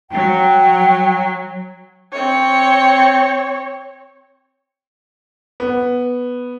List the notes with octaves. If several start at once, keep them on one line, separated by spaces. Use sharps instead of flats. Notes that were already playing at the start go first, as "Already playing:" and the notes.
F#3 G5
C4 C#5
B3